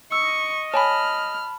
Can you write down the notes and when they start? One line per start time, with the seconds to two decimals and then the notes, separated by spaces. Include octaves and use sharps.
0.12 D#5 C#6 E6
0.74 C#5 G#5 A5 B5 F6